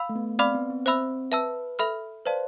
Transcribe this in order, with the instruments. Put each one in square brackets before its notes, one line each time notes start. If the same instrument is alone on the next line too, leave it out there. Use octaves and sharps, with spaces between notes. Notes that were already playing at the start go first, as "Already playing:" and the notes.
Already playing: [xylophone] F5 B5 E6
[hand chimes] A3
B3
[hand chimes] C4 [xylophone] D5 F5 B5 D6 F6
[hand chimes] B3
C4
[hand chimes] C4 [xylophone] C5 E5 B5 E6
[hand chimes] B4 [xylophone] E5 A5 E6
[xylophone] A4 E5 B5 F6
[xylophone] B4 D5 F5 A5 [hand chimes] C5